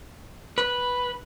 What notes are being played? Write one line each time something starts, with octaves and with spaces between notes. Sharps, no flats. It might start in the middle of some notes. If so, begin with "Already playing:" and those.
B4